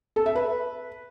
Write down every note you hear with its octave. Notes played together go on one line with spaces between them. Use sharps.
A4
E5
B4